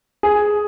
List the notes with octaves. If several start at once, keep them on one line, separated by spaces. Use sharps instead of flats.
G#4